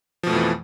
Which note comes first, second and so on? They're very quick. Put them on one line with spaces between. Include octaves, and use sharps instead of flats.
F3 B2 A3 F2 E3